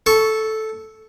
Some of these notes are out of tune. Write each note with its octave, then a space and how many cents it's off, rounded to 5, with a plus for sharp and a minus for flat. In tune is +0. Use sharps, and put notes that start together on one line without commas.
A4 -5 C#6 +5